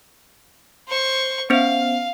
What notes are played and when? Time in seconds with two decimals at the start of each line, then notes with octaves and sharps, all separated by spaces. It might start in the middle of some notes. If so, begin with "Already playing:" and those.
0.88 C5 C#6
1.50 B3 C#4 C5 F5